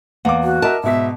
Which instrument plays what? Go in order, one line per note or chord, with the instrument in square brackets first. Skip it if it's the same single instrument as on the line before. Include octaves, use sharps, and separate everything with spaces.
[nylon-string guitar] E2 A#3 [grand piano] F#5 D6
[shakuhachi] F#4
[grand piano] A#4 D#5 E5 [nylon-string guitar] A5
[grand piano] G#2 B2 B6 [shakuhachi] E5